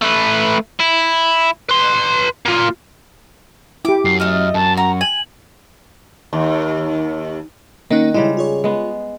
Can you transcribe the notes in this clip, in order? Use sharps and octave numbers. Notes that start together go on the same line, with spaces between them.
A3 B4
E4
B4 C6
A#3 F4
E4 G4 D6
F#2 C7
A3 D#5 F6
F#2 A5
F#4 A#5
G#5 F#7
D#2
D#3 A#3 C#4 D#4 F#5
C#3 G3 G#3 E4
F4 G#4 C#5
G#3 B3